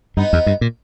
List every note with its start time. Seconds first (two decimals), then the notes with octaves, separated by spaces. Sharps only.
0.17 G2 B3 D#4
0.33 E2
0.46 G2
0.61 A#2